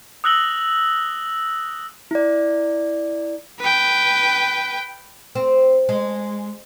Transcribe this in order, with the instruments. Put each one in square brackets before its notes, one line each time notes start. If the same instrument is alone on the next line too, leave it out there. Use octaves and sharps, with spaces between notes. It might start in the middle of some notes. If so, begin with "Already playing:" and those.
[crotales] D#6 E6 F#6 A#6 F#7 G7
[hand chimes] E4 D5
[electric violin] B4 G5
[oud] C4
G#3